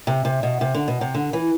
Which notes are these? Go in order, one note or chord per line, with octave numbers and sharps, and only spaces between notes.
C3
C3
B2
C3
D3
B2
C3
D3
E3